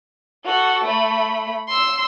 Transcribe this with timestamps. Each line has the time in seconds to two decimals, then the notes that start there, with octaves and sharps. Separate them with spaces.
0.46 F#4 A4
0.84 A3 B5
1.69 C6 E6